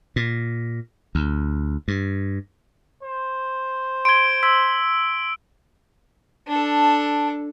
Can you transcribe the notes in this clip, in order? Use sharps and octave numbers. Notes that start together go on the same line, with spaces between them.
A#2
D2
G2
C5
C6 G#6 D7 G7
C6 E6 G#6 B6
D4 A4